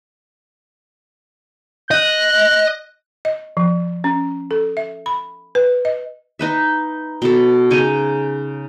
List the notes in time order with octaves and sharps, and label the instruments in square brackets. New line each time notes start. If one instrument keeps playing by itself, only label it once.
[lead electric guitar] D#5 [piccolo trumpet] F#6
[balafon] D#5
F3
C#4
A4
E5
B5
B4
D#5
[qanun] D#4 B4 E5
B2 A4
C#3 D#4 C#5 G#5